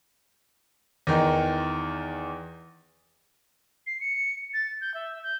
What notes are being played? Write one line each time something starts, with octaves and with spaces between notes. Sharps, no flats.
E2 D#3 D#4
C7
C#7
A6
G6
E5
G6